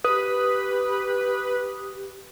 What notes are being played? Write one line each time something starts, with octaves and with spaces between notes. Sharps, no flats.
G4 B4 D#6